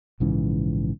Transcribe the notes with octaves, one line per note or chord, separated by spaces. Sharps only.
A#1 G#2 C#3 E3